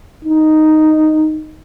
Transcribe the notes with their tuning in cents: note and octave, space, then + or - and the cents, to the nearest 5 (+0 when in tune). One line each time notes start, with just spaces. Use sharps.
D#4 -5